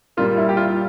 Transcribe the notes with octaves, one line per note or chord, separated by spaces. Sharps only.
A#2 G3 A#3 F4
E4
G4
F4